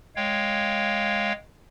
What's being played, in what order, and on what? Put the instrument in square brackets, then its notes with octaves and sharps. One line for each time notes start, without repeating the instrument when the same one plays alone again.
[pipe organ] G#3 C#5 F5 G5